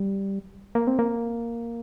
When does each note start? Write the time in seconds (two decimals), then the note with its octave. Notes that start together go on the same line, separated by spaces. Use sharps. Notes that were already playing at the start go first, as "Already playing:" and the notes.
Already playing: G3
0.75 A#3
0.87 C4
0.99 A#3